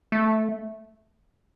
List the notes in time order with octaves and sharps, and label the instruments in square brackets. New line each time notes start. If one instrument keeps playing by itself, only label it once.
[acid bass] A3